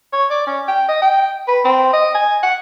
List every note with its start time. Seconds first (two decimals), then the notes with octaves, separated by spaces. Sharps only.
0.13 C#5
0.30 D5
0.46 C#4
0.68 G5
0.89 D#5
1.02 G5
1.48 B4
1.65 C4
1.93 D#5
2.15 G#5
2.43 F#5